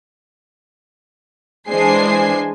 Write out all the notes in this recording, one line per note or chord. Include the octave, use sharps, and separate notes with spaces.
E3 G#3 D4 C5 G#5 C7